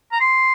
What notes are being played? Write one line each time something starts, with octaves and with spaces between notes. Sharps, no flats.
A#5
C6